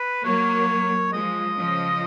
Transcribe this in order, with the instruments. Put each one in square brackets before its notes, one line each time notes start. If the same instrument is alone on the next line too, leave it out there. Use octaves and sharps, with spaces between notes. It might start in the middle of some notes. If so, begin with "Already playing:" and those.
Already playing: [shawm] B4
[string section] F#3 A#3 [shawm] C#5
[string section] F3 G#3 [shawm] D#5
[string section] C#3 F3